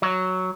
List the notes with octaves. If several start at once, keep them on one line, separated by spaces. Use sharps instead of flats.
F#3